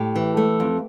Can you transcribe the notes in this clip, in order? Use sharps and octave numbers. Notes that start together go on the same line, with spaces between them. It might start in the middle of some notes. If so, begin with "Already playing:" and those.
Already playing: A2 G4
E3
A3
F2